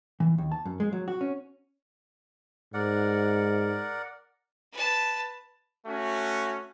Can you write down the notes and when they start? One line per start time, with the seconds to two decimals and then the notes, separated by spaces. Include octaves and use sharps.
0.20 E3
0.38 D#2
0.52 A5
0.65 F#2
0.80 G#3
0.93 F#3
1.08 F#4
1.21 C#4
2.74 G#2 A#4 D5 F#5
4.73 B4 A5
5.86 A3 C#4 F#4